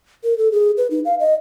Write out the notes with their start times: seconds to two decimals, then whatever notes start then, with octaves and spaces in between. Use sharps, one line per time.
0.24 A#4
0.38 A4
0.52 G#4
0.77 B4
0.91 D#4
1.05 F5
1.20 D#5